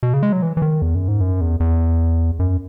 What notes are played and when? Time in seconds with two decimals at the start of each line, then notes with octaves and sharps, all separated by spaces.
0.03 B2
0.13 C#3
0.23 G#3
0.33 F#3
0.42 E3
0.57 E3
0.62 D#3
0.82 E2
0.95 F#2
1.08 G#2
1.21 F#2
1.41 E2
1.60 E2
2.39 F#2